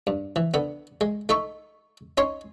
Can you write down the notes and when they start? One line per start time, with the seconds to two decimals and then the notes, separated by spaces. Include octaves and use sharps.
0.07 G2
0.36 E3
0.54 D3 B3
1.01 G#3
1.29 A3 D#4 E5 C#6
2.18 C#4 D#4 C#5 C6